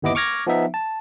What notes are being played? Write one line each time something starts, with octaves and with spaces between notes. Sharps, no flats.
G1 D#2 B3 E4 D#5 D6
C#6 D6 F6 G#6 A#6
F3 B3 D#4 E5
A5